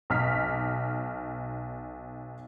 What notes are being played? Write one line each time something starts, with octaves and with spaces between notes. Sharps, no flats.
B1 F6 B6